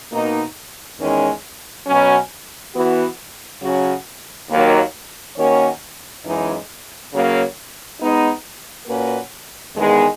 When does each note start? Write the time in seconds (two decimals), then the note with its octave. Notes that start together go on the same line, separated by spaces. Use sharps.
0.11 B2 A#3 D#4
0.99 E2 D#3 G#3 C#4
1.86 B2 F#3 C#4
2.74 E3 B3 F#4
3.62 C#3 F#3 C#4 F#4
4.49 D#2 D#3 F#3 A#3
5.36 D#3 A#3 C#4 F#4 C#5
6.24 F#2 E3 G#3 D#4
7.12 C#3 F#3 A#3
8.00 G#3 B3 D#4
8.87 A#2 A#3 C#4 F#4 B4
9.74 E2 D#3 G#3 B3